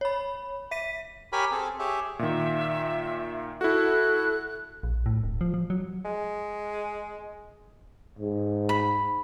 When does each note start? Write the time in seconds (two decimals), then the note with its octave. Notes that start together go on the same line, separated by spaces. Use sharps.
0.01 C#5 B5
0.71 E5 B6 D#7
1.33 G4 A#4 C#5 G#5 B5
1.52 C4 G#4 A4
1.79 G4 G#4 C#5 E5
2.19 A#2 D#3 E5
3.61 E4 F#4 A4 F#6
4.83 A#1
5.06 A2
5.24 D1
5.41 F3
5.54 F3
5.70 F#3
6.05 G#3
8.19 G#2
8.69 B5